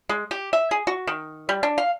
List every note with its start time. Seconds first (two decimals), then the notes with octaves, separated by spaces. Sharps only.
0.09 G#3
0.31 G4
0.53 E5
0.71 G#4
0.87 F#4
1.07 D#3
1.49 G3
1.63 D4
1.78 F5